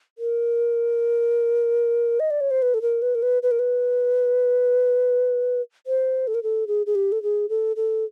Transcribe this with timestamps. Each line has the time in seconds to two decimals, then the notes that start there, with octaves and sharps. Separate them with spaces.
0.18 A#4
2.20 D#5
2.31 D5
2.41 C#5
2.51 C5
2.62 B4
2.74 A4
2.82 A#4
3.02 B4
3.15 A#4
3.22 B4
3.43 B4
3.51 A#4
3.59 B4
5.87 C5
6.27 A4
6.34 A#4
6.43 A4
6.67 G#4
6.86 G#4
6.95 G4
7.12 A4
7.23 G#4
7.49 A4
7.76 A4